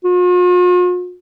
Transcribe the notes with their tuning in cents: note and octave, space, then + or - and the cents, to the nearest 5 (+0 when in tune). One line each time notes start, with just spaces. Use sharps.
F4 +45